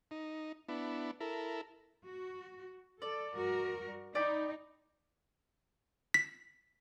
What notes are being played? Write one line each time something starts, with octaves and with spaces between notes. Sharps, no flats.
D#4
B3 D4 E4
E4 A4 A#4
F#4
A4 D5
G2 F#4 A#4
D#4 D5 G5 B5
B6